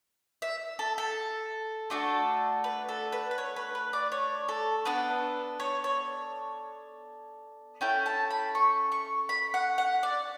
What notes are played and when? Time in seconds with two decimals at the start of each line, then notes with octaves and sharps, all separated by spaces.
0.42 E5
0.79 A4
0.98 A4
1.90 A3 D4 F#4 A4
2.64 B4
2.89 A4
3.12 B4
3.31 B4
3.38 C#5
3.56 B4
3.75 B4
3.93 D5
4.12 C#5
4.49 A4
4.85 B3 D4 A4 B4
5.60 C#5
5.84 C#5
7.81 C#4 E4 A4 G5
8.06 A5
8.30 B5
8.55 C#6
8.92 C#6
9.29 B5
9.54 F#5
9.78 F#5
10.03 D5